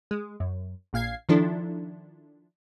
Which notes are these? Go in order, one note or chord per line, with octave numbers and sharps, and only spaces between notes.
G#3
F#2
A#1 A#2 F5 G#6 C7
D#3 F3 D4 E4 A4